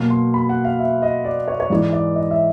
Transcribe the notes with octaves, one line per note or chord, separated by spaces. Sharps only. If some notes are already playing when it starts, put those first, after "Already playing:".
Already playing: B2 F#3 A#3
C6
B5
F#5
F5
E5
D#5
D5
C#5
C#5
G#2 E3 G#3 D5
D5
D#5
E5